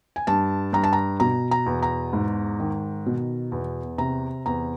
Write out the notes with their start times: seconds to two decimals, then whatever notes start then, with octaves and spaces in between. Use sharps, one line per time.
0.16 G#5
0.27 G2 A5
0.73 G2 A#5
0.84 A5
0.93 A#5
1.20 B2 A#5
1.51 A#5
1.66 E2
1.82 A#5
2.13 G#2
2.60 D#3
3.06 B2
3.52 E2
3.98 C3 A#5
4.46 E2 A#5